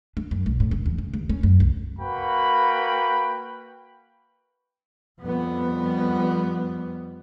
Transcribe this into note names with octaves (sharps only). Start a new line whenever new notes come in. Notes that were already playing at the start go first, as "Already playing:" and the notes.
D4
F#2
B1
A2
F1
E2
C#3
D#2
C#4
F#2
C2
A#3 F#4 B4 G5 B5
F2 G3 B3